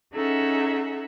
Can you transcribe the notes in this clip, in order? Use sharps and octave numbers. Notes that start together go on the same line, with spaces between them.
C#4 D#4 G#4 A4 E5 F#5